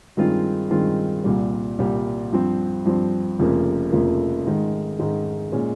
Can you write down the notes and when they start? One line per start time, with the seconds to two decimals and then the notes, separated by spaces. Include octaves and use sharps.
0.17 G2 D#3 G#3 C4 F4
0.71 G2 D#3 G#3 C4 F4
1.24 C2 A#2 G3
1.78 C2 A#2 G3
2.32 G2 F3 C4
2.85 G2 F3 C4
3.39 F1 F2 C#3 F3 A#3
3.92 F1 F2 C#3 F3 A#3
4.46 G#2 D#3 G#3
4.99 G#2 D#3 G#3
5.52 A#2 G#3 C#4